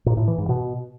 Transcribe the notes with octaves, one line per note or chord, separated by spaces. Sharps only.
A#2
A2
E3
G#2
B2